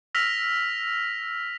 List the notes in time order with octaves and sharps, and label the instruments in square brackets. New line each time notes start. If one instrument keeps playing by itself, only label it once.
[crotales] E6 F6 A#6 B6 F7